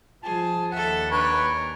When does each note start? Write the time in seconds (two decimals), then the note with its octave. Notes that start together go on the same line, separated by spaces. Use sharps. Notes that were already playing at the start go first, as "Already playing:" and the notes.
0.23 F3 G#4 A5
0.72 D#2 A4 E5 F#5
1.11 D4 A#4 B4 C#5 G#5 C#6